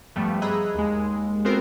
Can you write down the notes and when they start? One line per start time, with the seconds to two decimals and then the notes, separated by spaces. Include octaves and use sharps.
0.16 G2 F3 G3 A3 B3
0.42 G#4 D#5 A#5 B5 E6 F#6
0.75 D#2 G#3
1.45 B3 C4 F4 F#4 A#4 C5